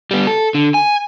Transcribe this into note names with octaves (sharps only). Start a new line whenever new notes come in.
G3 B3
A4
D3
G#5